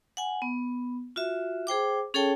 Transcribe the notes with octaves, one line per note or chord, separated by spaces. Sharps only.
F#5 G#5
B3
F4 F#4 E5
G#4 C5 G5 D6
C#4 G#4 A4 C#5 G5 A5